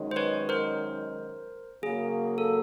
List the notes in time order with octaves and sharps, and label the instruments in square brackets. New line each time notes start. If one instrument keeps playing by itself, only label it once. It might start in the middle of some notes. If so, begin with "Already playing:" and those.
Already playing: [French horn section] F#2 D#3 G#3 C#4
[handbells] C5
B4 C#5
A#4 C5
[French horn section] C#3 F#3 A#3 [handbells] G#4
[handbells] A4